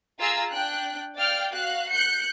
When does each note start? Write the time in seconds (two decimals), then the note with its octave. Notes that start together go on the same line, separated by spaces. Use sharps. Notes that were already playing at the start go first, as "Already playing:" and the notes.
0.19 F4 G#4 F5 A#5 E6
0.52 D4 G5 F#6
1.16 D5 F5 G5 F6
1.50 F#4 F5 F#6
1.91 F#6 G6 C#7